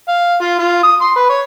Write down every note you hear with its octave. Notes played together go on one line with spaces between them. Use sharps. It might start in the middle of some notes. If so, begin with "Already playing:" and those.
F5
F4
F4
D#6
C6
B4
C#5